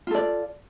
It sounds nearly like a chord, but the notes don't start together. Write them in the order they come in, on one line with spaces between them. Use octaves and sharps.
F4 A4 D5